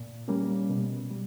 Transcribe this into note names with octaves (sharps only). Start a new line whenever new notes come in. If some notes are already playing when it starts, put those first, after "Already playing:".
Already playing: A#2
G3 A#3 C#4
B2
G3